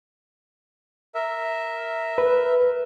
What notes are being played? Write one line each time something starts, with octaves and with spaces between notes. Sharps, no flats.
A#4 E5
B4